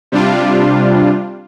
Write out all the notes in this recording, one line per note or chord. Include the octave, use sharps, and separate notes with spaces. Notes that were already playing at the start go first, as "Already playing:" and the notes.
C3 G3 D4 F4